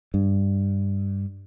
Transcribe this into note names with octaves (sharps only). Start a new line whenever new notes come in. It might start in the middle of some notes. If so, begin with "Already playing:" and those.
G2